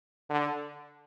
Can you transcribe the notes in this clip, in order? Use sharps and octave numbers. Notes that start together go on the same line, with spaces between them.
D3